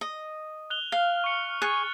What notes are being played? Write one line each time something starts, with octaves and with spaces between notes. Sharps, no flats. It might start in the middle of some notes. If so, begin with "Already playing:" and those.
D#5
F#6 F7 G7
F5 F6 G7
C#6 C#7
G#4 C#6 F#6 A6